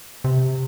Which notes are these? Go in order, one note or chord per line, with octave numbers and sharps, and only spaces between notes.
C3